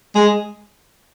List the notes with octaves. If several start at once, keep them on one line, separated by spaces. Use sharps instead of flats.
G#3